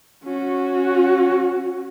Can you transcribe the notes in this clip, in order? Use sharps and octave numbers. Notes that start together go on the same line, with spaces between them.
C#4 F#4